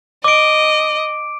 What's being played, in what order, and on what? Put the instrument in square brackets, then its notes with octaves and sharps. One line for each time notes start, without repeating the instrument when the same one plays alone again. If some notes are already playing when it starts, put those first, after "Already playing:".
[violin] D#5 [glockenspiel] D6 D7